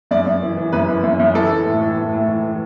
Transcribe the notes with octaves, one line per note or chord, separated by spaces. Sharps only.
F#2 D5
F#2
E3
E3
F#2 B4
E3
F#2
F#2
E3 A4
E3
A2
E3
A2
A2
E3
E3